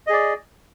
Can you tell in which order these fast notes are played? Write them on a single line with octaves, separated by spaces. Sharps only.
D#5 G#4 D5